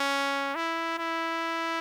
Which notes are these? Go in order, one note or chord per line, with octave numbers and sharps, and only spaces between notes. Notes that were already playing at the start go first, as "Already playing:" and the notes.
Already playing: C#4
E4
E4